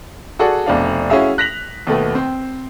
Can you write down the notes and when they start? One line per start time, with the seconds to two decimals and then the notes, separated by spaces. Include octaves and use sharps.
0.39 F#4 G#4 A4 D5 F#5
0.66 F1 B2 D4 F5
1.10 C#4 E4 F#4 G#4 E5 F5
1.38 F#6 A#6 B6 F7 F#7
1.87 D#2 B2 A3 B3
2.15 C4